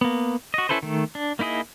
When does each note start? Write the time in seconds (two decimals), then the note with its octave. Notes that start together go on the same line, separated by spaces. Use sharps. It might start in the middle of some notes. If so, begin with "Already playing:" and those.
0.01 A#3 B3
0.54 F#4 D#5
0.69 C#4 E4 A4 B4 C5
0.83 D#3 A3
1.15 D4
1.39 A#3 D#4 E4 G#4 D#5